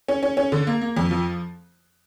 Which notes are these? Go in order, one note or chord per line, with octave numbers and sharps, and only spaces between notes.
C#4
C#4
C#4
D3
A#3
A#3
F2
F3